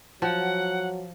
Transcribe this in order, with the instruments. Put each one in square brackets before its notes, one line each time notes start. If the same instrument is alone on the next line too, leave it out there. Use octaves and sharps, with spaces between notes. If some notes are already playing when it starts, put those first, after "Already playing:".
[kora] F3 [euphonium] F#3 [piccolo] F#5